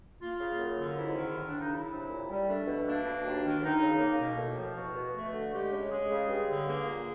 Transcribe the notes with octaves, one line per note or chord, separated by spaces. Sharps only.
A#3 F4
C#3
F#2
D3
G#2 E4
D#3
F#2
D4
C#3
D#4
F#3 E4
C3
A#2
G3
A3 D4
B2
A#3 D4
B2
D#2
D#3
F#2 D#4
C#3
A#3
B2
A2
F3
E2 F#4
B2
A3
D3
G#3 G4
C#3
G#3 G#4
C#3
G2
D3
A#3 G#4
A#2